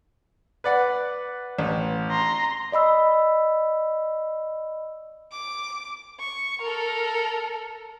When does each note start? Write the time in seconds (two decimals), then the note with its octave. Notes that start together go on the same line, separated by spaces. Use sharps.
0.64 B4 D5 F#5
1.59 A1
2.11 A#5 C6
2.72 D5 D#5 B5 E6
5.32 D6
6.20 C#6
6.62 A4 A#4